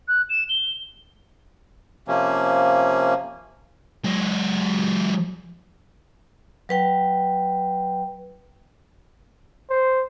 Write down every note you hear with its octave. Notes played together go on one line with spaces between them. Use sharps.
F#6
E7
G7
C3 F3 A#3 C#4
F#3 G#3
F#3 B4 G5
C5